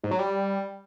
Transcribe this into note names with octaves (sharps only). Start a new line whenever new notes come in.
G#2
F#3
G3